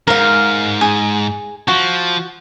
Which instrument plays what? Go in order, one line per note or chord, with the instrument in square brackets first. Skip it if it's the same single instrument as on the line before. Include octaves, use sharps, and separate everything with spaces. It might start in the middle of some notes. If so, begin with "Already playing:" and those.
[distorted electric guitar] F2 G#2 [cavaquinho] A#4 F5
[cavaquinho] G#4
[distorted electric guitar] F3 [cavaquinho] F#4